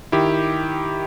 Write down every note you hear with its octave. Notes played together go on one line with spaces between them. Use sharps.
D#3 E4 G4